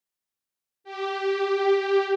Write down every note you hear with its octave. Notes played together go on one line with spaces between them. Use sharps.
G4